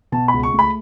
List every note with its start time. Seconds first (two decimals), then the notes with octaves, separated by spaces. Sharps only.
0.12 B2 A5
0.28 C#2 B5
0.43 C#6
0.54 A3
0.59 B5